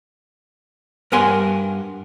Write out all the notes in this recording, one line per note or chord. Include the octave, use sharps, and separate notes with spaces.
G2 A#4 F#5 G#5 C6